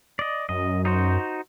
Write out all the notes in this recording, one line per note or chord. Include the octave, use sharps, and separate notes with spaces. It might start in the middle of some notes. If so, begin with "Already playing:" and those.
D5 D#5
F#2 D#5
D#4 F#4 C5